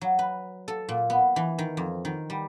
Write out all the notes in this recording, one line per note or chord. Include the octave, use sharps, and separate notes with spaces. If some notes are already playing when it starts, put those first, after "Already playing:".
F#3
B4
A4
A#2
B3
E3
D#3
F2
D#3
G3